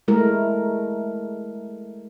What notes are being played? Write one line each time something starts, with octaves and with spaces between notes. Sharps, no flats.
G#3 A3 E4 A#4